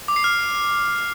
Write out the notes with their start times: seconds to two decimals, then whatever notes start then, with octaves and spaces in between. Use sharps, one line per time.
0.08 D6
0.16 C7
0.24 F6